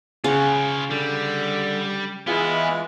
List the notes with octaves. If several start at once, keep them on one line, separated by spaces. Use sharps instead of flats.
C#3 F4 C#5 F#5
D3 G3
E3 G#3 B3 E4 F4